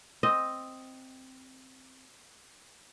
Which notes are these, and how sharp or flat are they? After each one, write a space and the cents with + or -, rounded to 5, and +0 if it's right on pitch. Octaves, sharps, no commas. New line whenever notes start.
C4 +0 D#5 +0